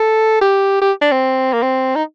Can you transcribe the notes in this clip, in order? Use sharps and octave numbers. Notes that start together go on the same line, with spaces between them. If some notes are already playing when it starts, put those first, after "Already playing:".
Already playing: A4
G4
G4
D4
C4
A#3
C4
D#4